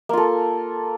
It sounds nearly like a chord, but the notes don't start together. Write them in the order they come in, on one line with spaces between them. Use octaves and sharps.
A#3 F4 A4